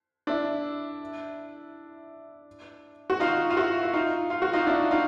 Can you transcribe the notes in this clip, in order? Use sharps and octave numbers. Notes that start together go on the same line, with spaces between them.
D4 E4
F#4
D#4 F4
F4
E4 F#4
E4
D#4 F4
F4
F#4
D#4 F4
D4 E4
D#4 F4